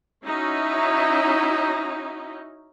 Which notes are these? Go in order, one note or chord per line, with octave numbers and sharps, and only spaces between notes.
C#4 D#4 E4 F#4